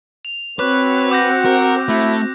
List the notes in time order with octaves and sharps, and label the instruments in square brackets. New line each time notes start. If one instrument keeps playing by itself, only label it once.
[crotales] F7
[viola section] C4 F#4 [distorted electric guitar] B4 [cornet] C#5 [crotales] D6 F#6
[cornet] F#5 [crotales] D6 G6 A#6
[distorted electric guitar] A#4
[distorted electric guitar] A3 [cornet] E4